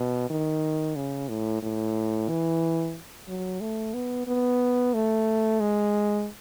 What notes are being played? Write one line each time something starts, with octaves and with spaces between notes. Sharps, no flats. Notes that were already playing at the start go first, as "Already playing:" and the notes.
Already playing: B2
D#3
C#3
A2
A2
E3
F#3
A3
B3
B3
A3
G#3